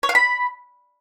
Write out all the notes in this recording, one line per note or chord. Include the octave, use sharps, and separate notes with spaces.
C#5
F5
B5